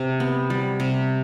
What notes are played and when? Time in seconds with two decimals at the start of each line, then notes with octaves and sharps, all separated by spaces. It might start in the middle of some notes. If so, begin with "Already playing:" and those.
Already playing: C3
0.20 B3
0.50 G3
0.80 C3